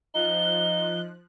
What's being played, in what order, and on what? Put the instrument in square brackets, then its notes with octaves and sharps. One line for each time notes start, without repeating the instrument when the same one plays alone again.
[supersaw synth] F3 F#6 [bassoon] D#4 [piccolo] G7